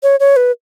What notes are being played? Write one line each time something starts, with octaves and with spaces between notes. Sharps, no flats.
C#5
C#5
B4